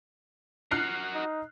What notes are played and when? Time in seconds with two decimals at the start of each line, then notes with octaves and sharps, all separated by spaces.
0.71 F#4 A#4 F6 F#6 C7
1.15 D#4